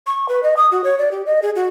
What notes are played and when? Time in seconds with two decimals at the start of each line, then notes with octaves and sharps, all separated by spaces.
0.07 C#6
0.29 B4
0.43 D#5
0.57 D#6
0.71 F#4
0.84 C#5
0.98 D5
1.11 G4
1.26 D#5
1.42 G#4
1.55 F#4